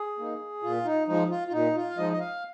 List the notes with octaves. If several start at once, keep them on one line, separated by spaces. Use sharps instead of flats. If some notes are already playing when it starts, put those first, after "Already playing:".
Already playing: G#4
A#3 D#4
A#2 F4
D#4
F3 G#3 D#4
F4
F4
A#2 D#4
F4
F5
F3 G#3 D#4 D#5
D#5
F5